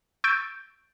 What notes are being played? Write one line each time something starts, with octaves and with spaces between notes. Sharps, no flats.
C#6 E6 G6 A6 D7